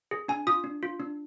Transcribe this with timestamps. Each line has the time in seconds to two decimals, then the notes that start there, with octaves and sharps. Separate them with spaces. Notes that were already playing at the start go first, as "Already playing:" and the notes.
0.11 G#4
0.28 D4 G#5
0.47 F4 D#6
0.64 D4
0.83 F4
1.00 D4